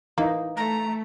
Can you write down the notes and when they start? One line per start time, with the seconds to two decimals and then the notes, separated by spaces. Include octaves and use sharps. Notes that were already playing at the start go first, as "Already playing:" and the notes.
0.18 E3 A#3 D#4
0.57 A3 A#5